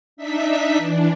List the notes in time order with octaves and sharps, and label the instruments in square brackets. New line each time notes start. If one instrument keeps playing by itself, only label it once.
[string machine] D4 D#4 E5 B6
E3 D4